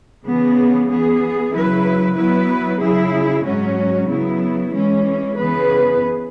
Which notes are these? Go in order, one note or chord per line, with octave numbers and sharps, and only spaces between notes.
C#3 E3 B3 G#4
E3 B3 G#4
C#3 F#3 E4 B4
F#3 B3 E4 B4
C#3 F#3 E4 G#4
G#2 F#3 C#4 F#4
C#3 F#3 B3 E4
E3 G#3 C#4
C#3 E3 B3 G#4 B4